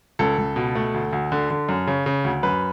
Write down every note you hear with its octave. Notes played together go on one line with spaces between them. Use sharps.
C#2 A4
C#2
B2
A3
D2
D2
D3
D3
F#2
C#3
C#3
D2
F#2 B4